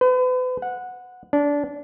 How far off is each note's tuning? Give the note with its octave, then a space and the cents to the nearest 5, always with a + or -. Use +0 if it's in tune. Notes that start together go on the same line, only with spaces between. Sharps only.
B4 +40
F#5 -10
D4 -20